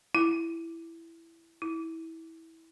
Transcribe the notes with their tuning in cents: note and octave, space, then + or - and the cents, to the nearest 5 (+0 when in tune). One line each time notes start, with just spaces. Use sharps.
E4 +10
E4 -20